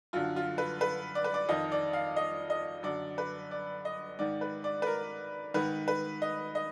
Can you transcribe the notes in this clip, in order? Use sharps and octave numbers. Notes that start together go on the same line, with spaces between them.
F#2 D3 F4
F4
B4
B4
D5
B4
D5
F2 D#3 D#5
D5
F5
D#5
D#5
F#2 D3 D5
B4
D5
D#5
G#2 D#3 D5
B4
D5
B4
A#4
G#2 D#3 B4
B4
D#5
D#5